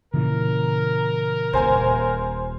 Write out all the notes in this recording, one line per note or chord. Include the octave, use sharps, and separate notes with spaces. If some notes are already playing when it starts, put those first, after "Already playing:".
A#2 C#3 E3 A#4
D#1 F4 C5 G#5